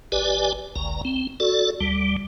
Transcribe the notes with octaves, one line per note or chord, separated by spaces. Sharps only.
G#1 G4 B4 D5 G#5
G1 C#2 A#5
C4
F#4 A4 D5
D2 G3